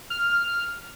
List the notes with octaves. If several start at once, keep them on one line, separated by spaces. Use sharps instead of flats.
F6